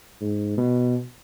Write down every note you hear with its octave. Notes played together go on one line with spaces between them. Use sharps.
G#2
B2